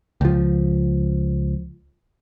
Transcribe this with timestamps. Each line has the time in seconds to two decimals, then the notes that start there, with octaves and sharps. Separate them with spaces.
0.21 C#2 F3